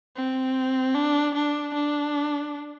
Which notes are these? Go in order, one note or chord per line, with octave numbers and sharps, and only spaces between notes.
C4
D4
D4
D4